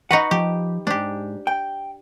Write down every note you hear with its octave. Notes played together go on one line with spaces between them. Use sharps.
D#4 F#4 B4 F#5
F3 G4
G#2 D4 G4
G5